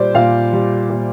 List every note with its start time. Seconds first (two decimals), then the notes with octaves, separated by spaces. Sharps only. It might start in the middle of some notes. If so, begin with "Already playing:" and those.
Already playing: A#2 G3 C5 D5
0.15 A#2 F5
0.53 G3
0.90 A#2